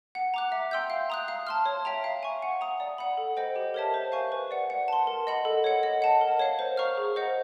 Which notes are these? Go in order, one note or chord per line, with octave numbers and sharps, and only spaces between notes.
F#5
A#5 D6 F#6
E5
G5 C6 E6 G6
F5
A#5 D#6 F#6
F5
A5 C6 F6
C#5
E5 G5 A#5
F5
G#5 C#6
F#5
A#5 D#6
D5
F#5 B5
A4
C5 D#5 G5
G4
A#4 C#5 E5 A5
C5
F5 G#5 C#6
B4
D5 F#5
F#5
A5 C6
A#4
D#5 F#5 B5
A4
C#5 F#5
D#5
F#5 A5
A#4
C#5 F5
C5
F5 A#5 C#6 F6
G#4
C5 D#5 F#5